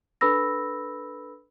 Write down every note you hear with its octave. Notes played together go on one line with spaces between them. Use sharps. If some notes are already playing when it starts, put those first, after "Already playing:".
D4 A4 B4 B5 E6 A#6